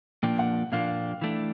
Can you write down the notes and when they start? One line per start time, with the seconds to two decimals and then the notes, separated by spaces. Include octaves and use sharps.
0.23 A#2 F3 A#3 D4 G5
0.39 F#5
0.72 A#2 F3 A#3 D4 F5
1.22 E3 A3 D4